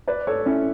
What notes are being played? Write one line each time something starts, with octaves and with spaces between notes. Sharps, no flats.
B4 D5
A4 C#5
C#4 E4